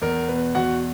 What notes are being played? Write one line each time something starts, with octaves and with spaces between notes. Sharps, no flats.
E2 A#4
B2 B4
E2 F#4 F#5